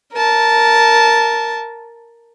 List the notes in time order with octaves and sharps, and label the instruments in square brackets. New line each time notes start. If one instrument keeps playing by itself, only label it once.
[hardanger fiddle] A#4 A5